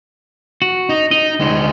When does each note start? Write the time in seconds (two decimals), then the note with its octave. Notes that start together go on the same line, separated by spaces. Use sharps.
0.62 F#4
0.89 D#4
1.11 D#4 D#5
1.40 D2 G#3